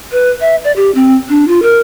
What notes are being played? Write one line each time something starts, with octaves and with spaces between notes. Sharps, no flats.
B4
E5
D5
G4
C4
D4
F4
A#4